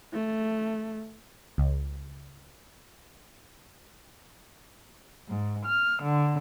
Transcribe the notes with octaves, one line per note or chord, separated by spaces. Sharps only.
A3
C#2
G#2
F6
D3